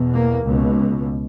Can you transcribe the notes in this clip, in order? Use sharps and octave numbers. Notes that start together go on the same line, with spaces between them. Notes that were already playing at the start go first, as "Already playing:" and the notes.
Already playing: E2 B2
A#3
C#2 B2